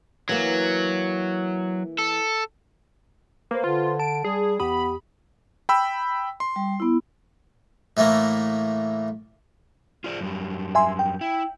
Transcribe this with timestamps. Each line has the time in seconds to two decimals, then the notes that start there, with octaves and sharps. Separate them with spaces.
0.29 E3 F#3 A#3
1.98 A4
3.51 A#3 B4 C5
3.64 D3 F4
4.00 A5 D7
4.24 G3 G#4
4.60 E2 B3 G4 B5 D#6
5.69 G5 B5 E6
6.40 C6
6.56 G3
6.80 B3 E4
7.97 A2 E3 A3 A#3
10.04 F4 G#4 D5
10.21 F#2 G3
10.75 E5 G#5 C6
10.99 G5
11.21 E4